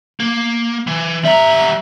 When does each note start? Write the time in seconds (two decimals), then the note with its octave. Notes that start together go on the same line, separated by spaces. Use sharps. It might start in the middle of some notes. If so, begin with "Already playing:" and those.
0.20 A#3
0.87 E3
1.25 G3 E5 A#5